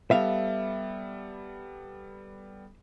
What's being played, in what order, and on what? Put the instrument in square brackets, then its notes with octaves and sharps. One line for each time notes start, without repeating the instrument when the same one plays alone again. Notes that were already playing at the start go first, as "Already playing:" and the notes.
[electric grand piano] G3 B3 A4 [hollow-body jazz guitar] E5 F5